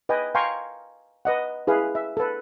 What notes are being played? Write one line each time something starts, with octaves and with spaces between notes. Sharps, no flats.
B4 D#5 G5 G#5
F5 G5 G#5 A#5 C6 C#6
B4 D#5 F#5
E4 G#4 B4 F5
E5
A4 B4